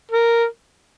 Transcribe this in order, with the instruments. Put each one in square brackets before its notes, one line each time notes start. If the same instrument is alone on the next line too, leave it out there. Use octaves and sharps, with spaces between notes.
[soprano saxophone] A#4